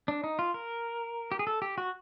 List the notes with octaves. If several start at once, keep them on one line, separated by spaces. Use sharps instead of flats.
D4
D#4
F4
A#4
G4
G#4
A4
G4
F#4